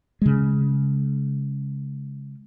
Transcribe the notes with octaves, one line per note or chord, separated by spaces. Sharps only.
C#3 G#3